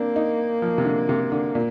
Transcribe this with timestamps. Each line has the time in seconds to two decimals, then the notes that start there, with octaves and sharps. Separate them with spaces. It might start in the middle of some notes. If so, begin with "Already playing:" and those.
Already playing: A#3 C4 D4
0.16 D#4
0.62 F3
0.78 C3
0.85 D3
1.09 C3
1.32 D3
1.55 A#2